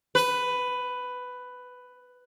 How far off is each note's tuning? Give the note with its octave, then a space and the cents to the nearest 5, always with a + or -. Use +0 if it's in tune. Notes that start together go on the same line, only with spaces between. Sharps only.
B4 +10